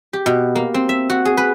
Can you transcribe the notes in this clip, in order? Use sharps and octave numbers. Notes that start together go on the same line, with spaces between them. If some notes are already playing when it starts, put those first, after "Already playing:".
G4
B2
A#3
C4
E5
F#4
G#4
B4